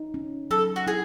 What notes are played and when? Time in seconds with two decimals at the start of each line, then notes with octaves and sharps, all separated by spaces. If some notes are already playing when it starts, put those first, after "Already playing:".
Already playing: D#4
0.14 C#4
0.50 F#3 A4
0.76 F#4
0.87 E4 G#4